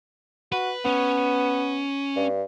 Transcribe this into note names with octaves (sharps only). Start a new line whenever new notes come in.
F#4 B4
B3 C#4
G2